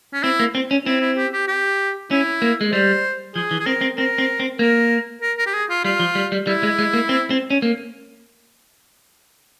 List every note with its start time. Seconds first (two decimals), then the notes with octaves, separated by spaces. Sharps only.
0.13 C#4
0.23 C4 E4
0.40 A#3
0.55 C4
0.71 C#4
0.86 C4 E4
1.01 E4
1.17 G4
1.33 G4
1.48 G4
2.11 C#4 E4
2.42 A#3
2.61 G#3
2.72 G3 C5
3.35 F3 G#4
3.51 E3
3.59 G#4
3.66 C4 A#4
3.81 C4
3.97 C4 A#4
4.18 C4
4.40 C4
4.59 A#3 A#4
5.22 A#4
5.38 A#4
5.46 G4
5.54 G#4
5.69 F4
5.84 G3 F4
6.00 F3
6.15 G3
6.32 G3
6.47 G3 E4
6.63 G#3
6.78 G#3
6.93 A#3
7.09 C4
7.30 C4
7.50 C#4
7.62 A#3